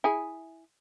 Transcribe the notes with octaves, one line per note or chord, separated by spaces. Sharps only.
E4 G#4